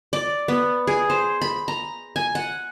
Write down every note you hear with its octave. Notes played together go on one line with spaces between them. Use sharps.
D5
B3
G#4
C5
B5
A#5
G#5
F#5